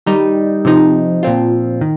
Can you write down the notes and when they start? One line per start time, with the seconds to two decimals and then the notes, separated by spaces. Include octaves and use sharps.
0.06 D#3 G3 D#4
0.65 C3 F3 D#4
1.23 A#2 F3 C4 F4
1.81 D#3